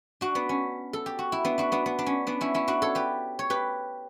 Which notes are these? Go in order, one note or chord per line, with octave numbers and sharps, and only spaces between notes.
D4 F#4
B3 D4
C#4
A4
G4
F#4
E4
B3 D4
D4 F#4
B3 D4
B3
D4
C#4
B3 D4
C#4 E4
C#4 E4
D4 F#4
A4 C#5
G4 B4
C#5
G4 B4